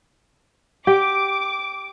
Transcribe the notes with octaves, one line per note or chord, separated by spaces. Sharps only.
G4 D6